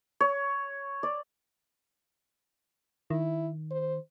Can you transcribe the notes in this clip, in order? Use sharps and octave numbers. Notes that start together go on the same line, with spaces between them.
C#5
D5
D#3 E4
C5